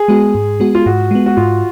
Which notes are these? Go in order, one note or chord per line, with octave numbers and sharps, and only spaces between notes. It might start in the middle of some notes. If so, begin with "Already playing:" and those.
Already playing: G#4
G#3 B3 F#4
G#2
G#3 B3 F#4
F4
G#2 F#4
G#3 B3
F#4
G#2 F4